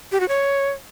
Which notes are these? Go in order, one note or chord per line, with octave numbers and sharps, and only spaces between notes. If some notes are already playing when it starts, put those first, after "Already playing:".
G4
F#4
C#5